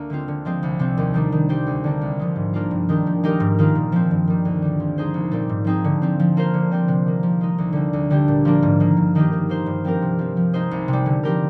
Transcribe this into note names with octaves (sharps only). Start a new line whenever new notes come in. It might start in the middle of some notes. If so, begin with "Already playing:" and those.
Already playing: D2 A#3 D4
D3 G#3 C4 F4
D3
F3 G#3 C4
C2
C3 G3 C4
D#2
D#3 G3 D4
D#3
G3 C4 G4 C5
D2
D3 G3 A#3 D4
C2
C3 F3 G#3
G#2
F3 A#3 D4 F4
G2
D#3 G#3 D4 G4
F3
G#3 D#4 G4 A#4
G#2
D#3 A#3 F4
A#2
F3 C4
G2
D#3 G3
D2
D3 G3
F3
G#3 D#4 G#4 C5
C2
A#2 G3 C4 G4
G#2
F3 C4 D#4 G#4
D3
F3 C4
F3
A#3 F4 C5
D3
G3 C4 G4 C5
C3
D#3 A#3
F3
G#3 D#4
D2
D3 G3 A#3
D2
D3 G3 D4 G4
A#2
F3 A#3 D4
G#2
D#3 A#3
G2
D#3 A#3 D#4 G4
D#3
A#3 F4 C5
G2
F3 C4 G4 A#4
C3
F3 C4
F3
G#3 D#4 G#4 C5
C2
C3
G3
D3
F3 C4 G4 A#4